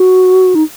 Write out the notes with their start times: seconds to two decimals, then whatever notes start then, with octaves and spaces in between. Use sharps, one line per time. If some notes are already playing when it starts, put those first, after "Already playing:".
Already playing: F#4
0.55 D#4